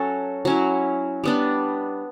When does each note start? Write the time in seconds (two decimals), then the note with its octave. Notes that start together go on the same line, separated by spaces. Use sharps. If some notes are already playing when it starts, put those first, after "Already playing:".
Already playing: F#3 C#4 F#4 A4
0.45 F#3 C#4 E4
1.24 G3 B3 D4